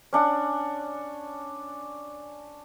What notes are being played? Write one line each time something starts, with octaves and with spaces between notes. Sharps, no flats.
C#4 D4 F#5